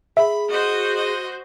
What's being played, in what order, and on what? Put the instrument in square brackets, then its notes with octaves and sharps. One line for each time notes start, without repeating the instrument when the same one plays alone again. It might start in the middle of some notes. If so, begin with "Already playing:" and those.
[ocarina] G#4 [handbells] E5 [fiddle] B5
[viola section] F#4 C5 [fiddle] D#5
[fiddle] D#5